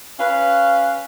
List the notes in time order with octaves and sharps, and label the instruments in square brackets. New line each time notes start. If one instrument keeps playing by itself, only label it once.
[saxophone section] C#4 B4 F5